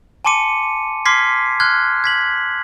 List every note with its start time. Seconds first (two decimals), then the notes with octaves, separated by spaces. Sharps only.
0.25 G#5 A5 C6 D6 C#7 D#7
1.06 C6 D6 F6 G#6 B6 C7
1.60 C6 F6 F#6 G#6
2.04 G#6 B6 F#7